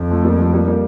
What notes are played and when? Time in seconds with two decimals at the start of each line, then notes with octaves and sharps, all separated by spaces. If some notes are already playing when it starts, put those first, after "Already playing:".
Already playing: F2
0.11 F3 A3
0.25 G3 A#3
0.39 F3 A3
0.53 G3 A#3
0.68 G3 A#3